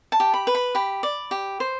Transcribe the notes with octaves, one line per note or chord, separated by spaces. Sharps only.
A5
G4
B5
B4
B5
G4 B5
D5
G4
C5